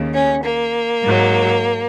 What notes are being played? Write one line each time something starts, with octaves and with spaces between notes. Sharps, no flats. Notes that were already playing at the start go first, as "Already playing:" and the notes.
Already playing: D#2 C#3
C#4
A#3
G#2 F#3